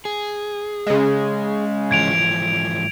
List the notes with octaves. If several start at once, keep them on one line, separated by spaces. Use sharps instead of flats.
G#4
C#3 G#3
G#2 E3 F3 G#6 D7 F7